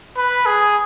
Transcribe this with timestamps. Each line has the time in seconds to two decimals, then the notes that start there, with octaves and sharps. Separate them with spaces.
0.17 B4
0.46 G#4